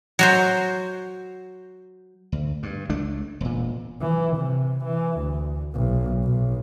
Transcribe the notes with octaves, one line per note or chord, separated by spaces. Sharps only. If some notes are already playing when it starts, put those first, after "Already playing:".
F#3 F#4 C5
D2
G2
C#2 A3 D4
E1 A#2
E3
C3
E3
D2
B1
B1